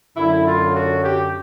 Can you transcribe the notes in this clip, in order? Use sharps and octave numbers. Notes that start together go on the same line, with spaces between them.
F#2 D3 F#3 E4
F4
F#4
G4